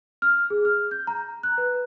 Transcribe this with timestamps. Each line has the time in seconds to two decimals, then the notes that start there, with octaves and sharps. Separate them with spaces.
0.22 F6
0.50 G#4
0.65 F6
0.91 G6
1.07 A#5
1.43 F#6
1.58 B4